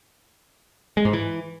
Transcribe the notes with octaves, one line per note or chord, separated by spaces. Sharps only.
G#3
G#2
E3